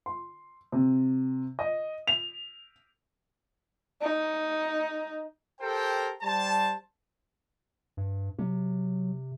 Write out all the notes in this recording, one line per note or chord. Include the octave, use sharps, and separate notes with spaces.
C6
C3
D#5
F7
D#4
G4 A4 A#4 C5 G5
G3 C5 A5
G2
C3 F#3